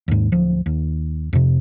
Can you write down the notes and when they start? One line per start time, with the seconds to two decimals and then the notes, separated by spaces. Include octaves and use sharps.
0.08 D#2 G#2
0.32 D1 F3
0.66 D#2
1.33 F2 C3